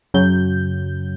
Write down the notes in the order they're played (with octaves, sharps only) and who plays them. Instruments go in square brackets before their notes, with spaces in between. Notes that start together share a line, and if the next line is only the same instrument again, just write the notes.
[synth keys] F#2 C#3 F#3 G6